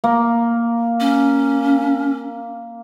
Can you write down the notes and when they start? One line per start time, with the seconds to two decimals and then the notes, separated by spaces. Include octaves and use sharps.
0.04 A#3
1.00 C#4